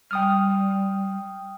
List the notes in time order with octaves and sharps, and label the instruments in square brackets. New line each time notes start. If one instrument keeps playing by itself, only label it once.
[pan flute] G3 [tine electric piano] G5 D#6 F6